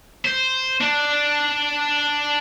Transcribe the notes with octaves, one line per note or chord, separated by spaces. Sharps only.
C5
D4